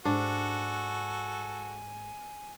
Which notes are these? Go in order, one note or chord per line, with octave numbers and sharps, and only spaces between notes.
G#2 D4 F#4 A4 G#5